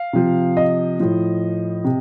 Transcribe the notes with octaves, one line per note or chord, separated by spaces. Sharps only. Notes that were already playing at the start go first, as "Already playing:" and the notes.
Already playing: F5
C3 F3
D#5
A2 F3
C3